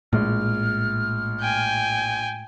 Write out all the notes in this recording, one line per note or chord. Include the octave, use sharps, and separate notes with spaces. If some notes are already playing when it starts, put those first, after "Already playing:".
A#1 A2 G#3 F6
G5 G#5